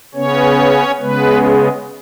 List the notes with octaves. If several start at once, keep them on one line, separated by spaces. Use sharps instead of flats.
C#3 B3 C#4 C#5
C#3 G#3 B3 B4